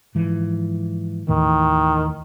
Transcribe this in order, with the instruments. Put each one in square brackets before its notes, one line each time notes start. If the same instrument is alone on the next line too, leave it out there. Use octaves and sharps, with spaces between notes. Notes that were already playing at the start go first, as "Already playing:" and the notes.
[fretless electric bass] G#2 E3 F3
[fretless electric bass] D#2 A2 E3 [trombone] D#3